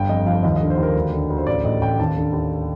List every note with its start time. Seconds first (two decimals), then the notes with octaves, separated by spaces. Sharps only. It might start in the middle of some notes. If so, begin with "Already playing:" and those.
Already playing: G1 G5
0.09 F2 D#5
0.26 F3 F5
0.43 D#2 D#5
0.56 D#5
0.61 D3
0.70 C5
0.78 D#2
0.83 A#4
0.96 D2
1.12 D3
1.30 D2
1.38 C5
1.47 A1 D5
1.64 A2 D#5
1.81 A1 G5
1.99 D#2 A5
2.16 D3
2.33 D#2